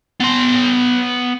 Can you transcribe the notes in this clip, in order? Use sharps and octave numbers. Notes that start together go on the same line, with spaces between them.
B3 C6